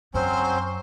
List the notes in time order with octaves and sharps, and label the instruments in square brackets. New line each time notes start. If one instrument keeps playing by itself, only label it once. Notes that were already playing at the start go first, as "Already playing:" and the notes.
[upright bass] F#2 [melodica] F#3 C4 C#4 [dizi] C5